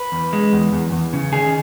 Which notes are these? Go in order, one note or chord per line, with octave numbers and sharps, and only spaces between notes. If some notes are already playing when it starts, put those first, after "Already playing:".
Already playing: B4
E2
G#3
E2
E2
E2
C#3
D#3 G#4